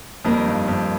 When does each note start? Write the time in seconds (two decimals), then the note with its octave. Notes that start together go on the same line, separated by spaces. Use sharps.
0.25 F2 D#3 G3 A#3 D#4 A#4
0.46 G2
0.68 F2